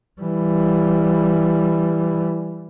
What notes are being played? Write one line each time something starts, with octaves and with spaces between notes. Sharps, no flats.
E3 G3